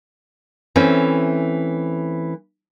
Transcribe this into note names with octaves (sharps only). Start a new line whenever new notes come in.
E3 A3 C4 C#4